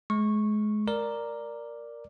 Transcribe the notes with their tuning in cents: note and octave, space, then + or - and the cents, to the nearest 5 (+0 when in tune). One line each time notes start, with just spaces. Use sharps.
G#3 +30 C#6 -15
A#4 +0 D5 +0 A#5 +0